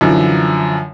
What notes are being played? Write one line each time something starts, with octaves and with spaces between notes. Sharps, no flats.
F#2 D3 E3 F3